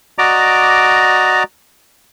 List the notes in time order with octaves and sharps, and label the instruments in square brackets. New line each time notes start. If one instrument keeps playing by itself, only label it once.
[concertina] F#4 D5 D#5 A#5 D6